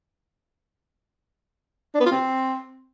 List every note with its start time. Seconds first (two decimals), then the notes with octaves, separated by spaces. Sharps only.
1.95 D4
2.00 B3
2.06 F4
2.11 C4